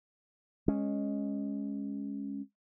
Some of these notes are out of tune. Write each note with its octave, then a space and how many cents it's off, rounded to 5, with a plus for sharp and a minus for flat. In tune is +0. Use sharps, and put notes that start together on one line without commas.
G#3 -5 C#4 +0